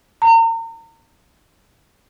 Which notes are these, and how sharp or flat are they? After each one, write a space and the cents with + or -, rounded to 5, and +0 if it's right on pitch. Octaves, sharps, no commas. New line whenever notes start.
A#5 -35